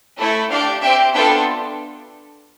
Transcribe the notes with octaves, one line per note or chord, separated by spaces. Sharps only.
A3 E4 A4
D4 G4 D5 F5
C4 G4 E5 G5
B3 D4 F4 A4 E5 G5